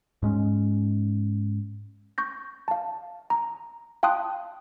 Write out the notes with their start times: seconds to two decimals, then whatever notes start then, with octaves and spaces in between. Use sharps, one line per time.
0.22 G#2 G#3 C#4
2.18 C#6 G6 A#6
2.68 F5 A5
3.30 A#5
4.03 F5 G5 A5 C6 D#6 F#6